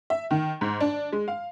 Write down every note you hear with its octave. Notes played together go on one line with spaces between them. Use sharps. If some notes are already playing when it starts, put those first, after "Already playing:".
E5
D#3
G#2
D4
G#3
F5